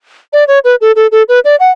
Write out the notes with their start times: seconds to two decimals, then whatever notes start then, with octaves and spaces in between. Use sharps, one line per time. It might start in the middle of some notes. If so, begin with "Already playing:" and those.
0.33 D5
0.48 C#5
0.64 B4
0.81 A4
0.96 A4
1.12 A4
1.29 B4
1.45 D5
1.60 F#5